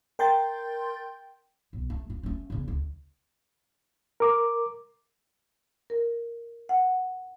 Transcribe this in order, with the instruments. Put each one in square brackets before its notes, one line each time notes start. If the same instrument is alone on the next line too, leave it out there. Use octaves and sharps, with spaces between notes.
[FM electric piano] A#4 G5 C6 G6 A6
[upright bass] B1
A3
F4
A3 C#4
E2 C#3
D2
[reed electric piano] A#4 D6
[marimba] A#4
F#5